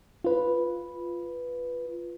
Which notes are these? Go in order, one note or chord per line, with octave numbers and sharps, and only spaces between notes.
F4 B4